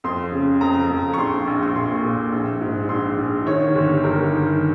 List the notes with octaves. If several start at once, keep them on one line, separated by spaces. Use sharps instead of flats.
F2 C6
C#3
F2 A#5
F2
C#6
A#1 C6
A#1
C#6
A#2 C6
A#2
A#1
G#2
A#1 C6
A#1
D#3 C#5
G1
G1 A#4
D#3